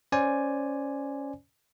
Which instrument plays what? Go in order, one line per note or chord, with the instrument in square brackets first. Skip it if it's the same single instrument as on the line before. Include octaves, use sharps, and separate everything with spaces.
[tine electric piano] C#4 C5 D5 G#5